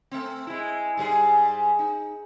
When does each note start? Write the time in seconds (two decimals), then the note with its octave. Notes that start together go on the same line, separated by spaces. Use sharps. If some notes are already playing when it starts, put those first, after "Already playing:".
0.11 A3 C4
0.47 G#3 E4
0.97 G#2 G3 G#4
1.79 D#4